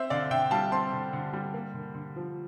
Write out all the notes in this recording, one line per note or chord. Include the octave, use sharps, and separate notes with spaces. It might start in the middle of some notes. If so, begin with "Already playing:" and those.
Already playing: C4 C5 E5
D3 D5 F5
D3 E5 G5
G3 F5 A5
C4 A5 C6
D3
D3
G3
A#3
D3
D3
F3